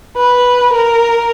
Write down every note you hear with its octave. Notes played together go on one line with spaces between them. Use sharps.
B4
A#4